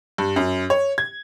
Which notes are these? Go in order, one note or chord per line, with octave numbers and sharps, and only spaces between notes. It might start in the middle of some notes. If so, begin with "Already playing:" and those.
G2
F#2
C#5
G#6